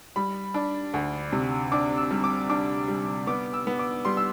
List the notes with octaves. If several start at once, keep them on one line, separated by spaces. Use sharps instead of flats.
G3 B5
D4
D2
C3
D4 D6
E6
G3
D6
D4 D6
G3
B3 D6
E6
B3
D6
G3 C6
E6